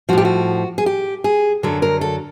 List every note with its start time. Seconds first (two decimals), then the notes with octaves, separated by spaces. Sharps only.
0.09 F3 F#4
0.13 A2 G4
0.25 F#4
0.78 G#4
0.86 G4
1.24 G#4
1.63 F#2 D3 F#3 A4
1.82 A#4
2.01 A4